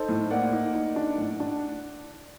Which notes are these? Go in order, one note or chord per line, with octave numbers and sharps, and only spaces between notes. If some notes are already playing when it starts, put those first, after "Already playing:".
Already playing: D#4 A4 C5
A2
A#3 D5 F#5
D#4
D#4
D4
A2
D4